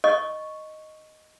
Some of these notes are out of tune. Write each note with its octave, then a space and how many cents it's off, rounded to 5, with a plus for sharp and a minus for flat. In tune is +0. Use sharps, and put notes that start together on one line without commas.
D#5 +0 C#6 +0